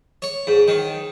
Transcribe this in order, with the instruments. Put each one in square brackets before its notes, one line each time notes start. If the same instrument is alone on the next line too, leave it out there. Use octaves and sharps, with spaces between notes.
[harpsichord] C#5
G#2
D#3